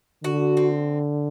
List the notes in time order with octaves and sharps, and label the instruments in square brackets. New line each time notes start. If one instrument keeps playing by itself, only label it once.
[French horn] D3 [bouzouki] F#4
[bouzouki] C4